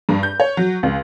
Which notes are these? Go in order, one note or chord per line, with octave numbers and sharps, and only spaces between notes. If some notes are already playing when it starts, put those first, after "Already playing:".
G2
G6
C#5
F#3
C#2